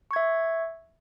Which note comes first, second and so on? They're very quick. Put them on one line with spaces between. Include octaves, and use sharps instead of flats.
C#6 G#6 E5